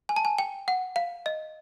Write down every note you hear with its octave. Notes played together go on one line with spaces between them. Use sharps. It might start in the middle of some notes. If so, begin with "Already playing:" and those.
G#5
A5
G#5
G5
F#5
F5
D#5